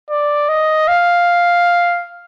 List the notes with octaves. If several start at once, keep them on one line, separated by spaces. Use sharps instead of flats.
D5
D#5
F5